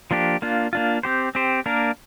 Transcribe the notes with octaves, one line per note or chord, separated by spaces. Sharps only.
F3 A#3 D4 G4
A#3 D4 F4
A#3 D4 F4
C4 G4 C5
C4 G4 C5
A#3 D4 A#4